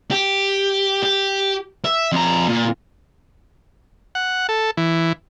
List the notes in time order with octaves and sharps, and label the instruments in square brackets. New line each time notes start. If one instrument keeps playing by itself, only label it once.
[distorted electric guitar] G4
G4
E5
F2 A#5
A#2
[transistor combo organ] F#5
A4
E3